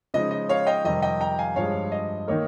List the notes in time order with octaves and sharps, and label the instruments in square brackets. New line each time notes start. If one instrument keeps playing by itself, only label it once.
[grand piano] C#3 F3 G#3 D#4 [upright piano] D#5
[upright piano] D#5
C#5 F5
D#5 G5
[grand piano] F2 C3 D#3 G3 [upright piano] D#5
[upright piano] D#5 G5
G5 A#5
F5 G#5
[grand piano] G2 F3 G#3 [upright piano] C#5 F5
[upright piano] D#5
[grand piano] D#3 A#3 D#4 A#4 [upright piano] C#5